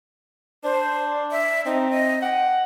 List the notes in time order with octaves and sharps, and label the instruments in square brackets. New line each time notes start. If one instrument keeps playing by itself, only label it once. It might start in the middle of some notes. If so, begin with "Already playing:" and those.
[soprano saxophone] D4 [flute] C5
[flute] E5
[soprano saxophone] C4 [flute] D#4
[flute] D#5
[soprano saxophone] F#5 [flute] G5